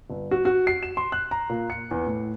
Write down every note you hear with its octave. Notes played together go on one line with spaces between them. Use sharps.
G1
F#4
F#4
C7
E7
C6
F#6
A#5
A#2
C#7
E2
A2